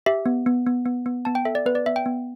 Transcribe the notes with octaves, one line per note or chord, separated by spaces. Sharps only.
G4 E5
B3
B3
B3
B3
B3
B3 A5
G5
A4 E5
D5
B3 B4
D5
B3 E5
G5
B3